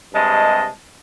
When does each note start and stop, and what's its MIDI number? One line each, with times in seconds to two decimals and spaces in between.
0.14 0.69 43
0.14 0.69 48
0.14 0.69 56
0.14 0.69 75
0.14 0.69 81